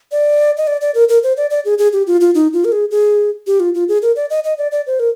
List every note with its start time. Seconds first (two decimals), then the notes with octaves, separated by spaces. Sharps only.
0.12 D5
0.57 D#5
0.67 D5
0.81 D5
0.95 A#4
1.09 A#4
1.23 C5
1.37 D5
1.50 D5
1.65 G#4
1.78 G#4
1.93 G4
2.07 F4
2.21 F4
2.35 D#4
2.53 F4
2.65 A#4
2.72 G#4
2.91 G#4
3.47 G4
3.60 F4
3.74 F4
3.89 G#4
4.02 A#4
4.16 D5
4.30 D#5
4.44 D#5
4.58 D5
4.72 D5
4.87 C5
5.00 A#4